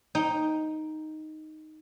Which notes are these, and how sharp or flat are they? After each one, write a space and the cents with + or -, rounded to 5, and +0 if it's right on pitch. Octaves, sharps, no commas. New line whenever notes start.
D#4 +0 G5 +5